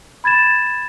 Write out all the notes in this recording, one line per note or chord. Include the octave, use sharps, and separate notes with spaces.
B5 G#6 A6 E7